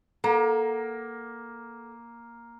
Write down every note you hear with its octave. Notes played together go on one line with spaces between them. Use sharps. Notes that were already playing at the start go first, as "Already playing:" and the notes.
A#3 A4 F#5 A#5